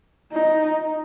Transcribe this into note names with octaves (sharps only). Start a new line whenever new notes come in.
D#4